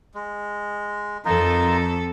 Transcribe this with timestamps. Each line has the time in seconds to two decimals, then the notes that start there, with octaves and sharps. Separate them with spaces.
0.14 G#3
1.25 F2 D#4 F4 A4 A#4